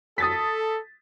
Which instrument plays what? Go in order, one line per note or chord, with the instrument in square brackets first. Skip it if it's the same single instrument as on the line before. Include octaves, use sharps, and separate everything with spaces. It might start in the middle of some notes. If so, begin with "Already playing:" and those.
[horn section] A4 [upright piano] D#6 A6 B6